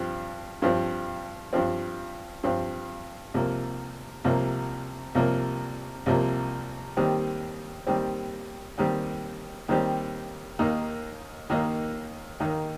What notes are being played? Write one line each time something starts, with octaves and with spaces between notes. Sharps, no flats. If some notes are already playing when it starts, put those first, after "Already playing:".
Already playing: G2 F3 C4
G2 F3 C4
G2 F3 C4
G2 F3 C4
C2 C3 F3 A#3
C2 C3 F3 A#3
C2 C3 F3 A#3
C2 C3 F3 A#3
D#2 D#3 G3 C4 G4
D#2 D#3 G3 C4 G4
D#2 D#3 G3 C4 G4
D#2 D#3 G3 C4 G4
D#2 D#3 A#3 D#4
D#2 D#3 A#3 D#4
D#2 D#3 A#3 D#4